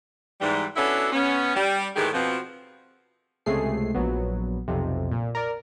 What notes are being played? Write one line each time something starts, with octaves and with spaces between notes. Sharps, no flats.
G#2 E3 G3
B3 C#4 D4 E4 F#4 A4
B3 C#4
G3
A2 D#3 E3 G#3 G4 G#4
B2 F3 C4
C#2 C3 G#3 A3 G#4 C7
A#1 F#3 B3
B1 F2 C3
A#2
A#4 D5